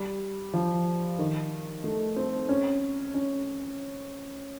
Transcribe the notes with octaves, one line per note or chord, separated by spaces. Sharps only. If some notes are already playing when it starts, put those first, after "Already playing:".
Already playing: G3
F3
D#3
A3
C4
C#4
C#4